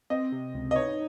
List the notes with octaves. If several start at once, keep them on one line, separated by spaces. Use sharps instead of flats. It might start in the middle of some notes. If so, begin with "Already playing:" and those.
C4 D#5
C3
C#2
D#5
D#4 C#5